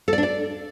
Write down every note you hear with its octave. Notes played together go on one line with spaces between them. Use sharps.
A4
D5
D4
D5